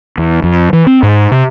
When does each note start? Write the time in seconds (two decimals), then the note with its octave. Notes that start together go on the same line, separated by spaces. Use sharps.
0.18 E2
0.44 F2
0.73 E3
0.87 C4
1.03 G#2
1.32 C3